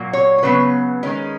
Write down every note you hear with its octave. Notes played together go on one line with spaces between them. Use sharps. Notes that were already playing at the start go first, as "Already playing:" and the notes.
Already playing: A#2 F#3 A#3
C#5
C#5
C#3 F#3 B3 B4
D#3 G#3 C#4